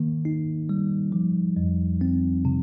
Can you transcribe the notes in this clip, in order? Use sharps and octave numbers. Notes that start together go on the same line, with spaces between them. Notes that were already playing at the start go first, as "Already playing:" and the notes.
Already playing: D#3 A#3
D#4
G3
F3
F2
C4
C3